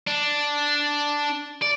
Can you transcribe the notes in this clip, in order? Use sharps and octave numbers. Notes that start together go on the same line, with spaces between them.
D4
D5